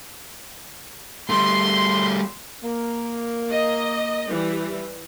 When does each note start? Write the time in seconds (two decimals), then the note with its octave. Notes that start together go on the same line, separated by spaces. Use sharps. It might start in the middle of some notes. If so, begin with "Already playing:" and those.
1.30 G3 A3 C6
2.62 A#3
3.52 D#5
4.30 E3 G3